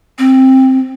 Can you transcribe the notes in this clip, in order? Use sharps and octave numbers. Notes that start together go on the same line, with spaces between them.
C4